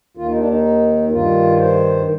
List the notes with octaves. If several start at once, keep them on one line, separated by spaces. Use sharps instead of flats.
D#2 D#3 F4
D#4
D4
D#4
G2 D#3 F4
C5